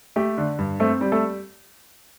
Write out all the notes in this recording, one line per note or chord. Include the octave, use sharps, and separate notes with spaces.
A3 G4
D3
G2
A3 C4 A4
G3
A3 A4